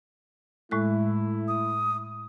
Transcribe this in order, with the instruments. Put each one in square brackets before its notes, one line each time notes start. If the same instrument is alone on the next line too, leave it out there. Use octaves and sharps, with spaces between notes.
[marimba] A2 G#3 F#6 [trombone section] A3 E4
[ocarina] D#6